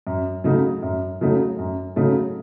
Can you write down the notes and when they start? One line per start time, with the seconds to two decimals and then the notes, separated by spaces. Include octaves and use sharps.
0.07 F#2
0.44 C#3 F#3 A3 D#4
0.83 F#2
1.21 C#3 F#3 A3 D#4
1.59 F#2
1.96 C#3 F#3 A3 D#4